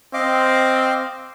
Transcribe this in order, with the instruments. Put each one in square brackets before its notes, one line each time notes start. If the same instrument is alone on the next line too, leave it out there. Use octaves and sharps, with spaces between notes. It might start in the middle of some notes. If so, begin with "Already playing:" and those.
[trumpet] C4 [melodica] D#5 F5 D6